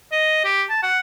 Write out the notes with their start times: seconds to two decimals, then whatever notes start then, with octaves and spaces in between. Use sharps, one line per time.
0.12 D#5
0.44 G4
0.70 A5
0.83 F#5